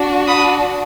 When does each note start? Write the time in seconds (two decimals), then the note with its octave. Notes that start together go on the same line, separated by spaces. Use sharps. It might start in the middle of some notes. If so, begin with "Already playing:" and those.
Already playing: D4 F#4
0.27 B5 D#6